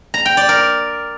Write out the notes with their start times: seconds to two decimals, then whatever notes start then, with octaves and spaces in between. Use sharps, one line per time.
0.14 A#5
0.25 G5
0.37 D5
0.49 A#4